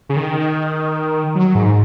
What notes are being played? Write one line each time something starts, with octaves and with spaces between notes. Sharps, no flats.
C#3
D#3
F#3
G#2